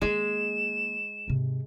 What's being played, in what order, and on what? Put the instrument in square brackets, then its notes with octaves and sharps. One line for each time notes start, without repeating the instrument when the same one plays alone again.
[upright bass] D#3 A#3 [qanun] G#3 [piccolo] E7
[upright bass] G#2 C3